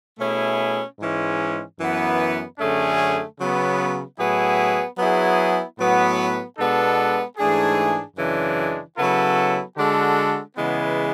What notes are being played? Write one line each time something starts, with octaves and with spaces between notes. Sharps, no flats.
B2 A3 C#4 E4 G#4
G#2 E3 G#3 C#4
F#2 E3 B3
F#2 D3 A3 C#4 G#4
C#3 F#3 B3
A2 F#3 B3 E4 G#4
F#3 B3 E4 G#4
A2 F#3 B3
B2 G#3 B3 D4 A4
G#2 E3 A3 D4 G#4
F#2 C#3 E3 G#3 D4
C#3 F#3 B3 E4 A4
D3 G#3 D4 F#4 A4
C#3 E3 G#3 B3